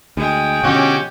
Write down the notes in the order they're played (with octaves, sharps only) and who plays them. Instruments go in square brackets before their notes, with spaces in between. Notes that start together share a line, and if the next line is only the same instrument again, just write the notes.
[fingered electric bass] D2 [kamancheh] G#3 G5
[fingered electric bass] B2 D3 F3 [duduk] C#4 [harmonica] F#4 G4 C#5